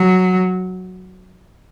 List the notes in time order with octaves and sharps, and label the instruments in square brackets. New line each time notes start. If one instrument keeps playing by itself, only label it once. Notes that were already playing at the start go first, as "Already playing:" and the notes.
Already playing: [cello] F#3